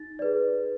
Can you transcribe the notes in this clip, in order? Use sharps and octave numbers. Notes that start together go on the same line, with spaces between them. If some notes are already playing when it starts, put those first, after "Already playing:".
Already playing: D#4 A6
G#4 B4 D5